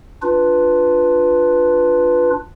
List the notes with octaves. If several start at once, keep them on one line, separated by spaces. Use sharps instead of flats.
D4 F4 B4